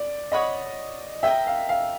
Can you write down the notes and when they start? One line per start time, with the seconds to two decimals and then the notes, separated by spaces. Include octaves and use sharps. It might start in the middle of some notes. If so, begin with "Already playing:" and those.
Already playing: D5
0.32 C#5 D#5 F#5 B5 D#6
1.23 A#4 D#5 E5 G5
1.47 F5
1.69 F5